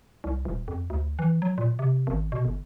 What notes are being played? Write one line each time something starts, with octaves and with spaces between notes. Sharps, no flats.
C2
D#1
F2
D2
E3
F#3
A#2
C3
G#1
B2
G1